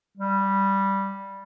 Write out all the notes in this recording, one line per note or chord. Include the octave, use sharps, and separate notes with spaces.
G3